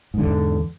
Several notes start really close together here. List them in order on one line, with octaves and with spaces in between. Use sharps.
G#2 D3 E2